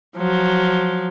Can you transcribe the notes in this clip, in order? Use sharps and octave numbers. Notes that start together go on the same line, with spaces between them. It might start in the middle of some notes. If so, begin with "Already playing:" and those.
F3 F#3